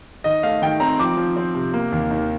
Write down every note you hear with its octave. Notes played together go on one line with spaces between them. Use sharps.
D#3 D#5
A3 F5
D#3 G5
C4 A#5
F3 D6
F3
C4
C3
A#3
D#2
D#3